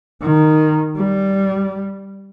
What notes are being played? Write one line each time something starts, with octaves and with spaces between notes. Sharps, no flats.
D#3
G3